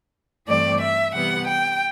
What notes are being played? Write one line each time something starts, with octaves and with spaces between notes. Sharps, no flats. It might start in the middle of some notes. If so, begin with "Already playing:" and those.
G2 E3 A3 C4 D5
E5
C3 E3 G3 B3 F#5
G5